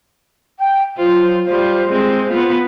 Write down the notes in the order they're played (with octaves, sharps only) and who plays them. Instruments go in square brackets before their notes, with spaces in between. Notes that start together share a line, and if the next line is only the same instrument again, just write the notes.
[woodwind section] G5
[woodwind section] F#3 C5 [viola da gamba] F4
[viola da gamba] G3 F4 [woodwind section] C5
[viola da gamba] G#3 C4
B3 F4